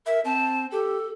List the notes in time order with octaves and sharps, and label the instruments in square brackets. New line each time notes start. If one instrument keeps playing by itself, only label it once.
[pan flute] A#4 [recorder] E5
[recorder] C4 [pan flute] A5
[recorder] G4 [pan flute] A4